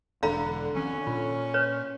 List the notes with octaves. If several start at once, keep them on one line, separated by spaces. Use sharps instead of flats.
E1 D3 F5 A#5 B5
D#3 F3 C4 C#4
A#2 F4
B4 C#5